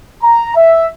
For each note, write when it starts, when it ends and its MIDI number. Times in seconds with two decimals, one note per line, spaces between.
0.23 0.52 82
0.56 0.88 76